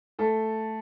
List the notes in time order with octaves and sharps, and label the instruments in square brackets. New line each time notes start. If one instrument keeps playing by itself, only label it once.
[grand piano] A3 A4